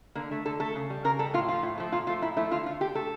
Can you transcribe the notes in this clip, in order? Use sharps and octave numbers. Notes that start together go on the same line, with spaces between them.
D3 A#3
A3
D3 A4
A3 A4
C#3
G3
C#3 A#4
G3 A4
A2 F4
F3 A3 F4
A2
F3 A3
A#2 F4
F3 A3 F4
A#2 E4
F3 A3 E4
D3 F4
A3 F4
D3 G4
A3 A4